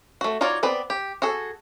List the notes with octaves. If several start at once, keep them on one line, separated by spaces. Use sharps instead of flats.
A3 F#4
D#4 F4 F#4 C#5 D5
B3 C4 B4 D5
G4
F#4 G#4 A4